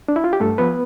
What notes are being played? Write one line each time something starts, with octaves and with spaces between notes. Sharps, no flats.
D4
E4
F4
G4
G2 A3 A4
F3 B3 B4